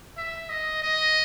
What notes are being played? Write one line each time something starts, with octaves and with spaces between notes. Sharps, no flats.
E5
D#5
D#5